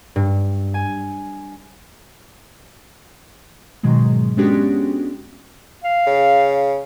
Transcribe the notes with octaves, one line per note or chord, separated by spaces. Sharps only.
G2
G#5
G#2 B2 D#3 F#3 G#3
G#3 B3 C#4 D4 F#4 G4
F5
C#3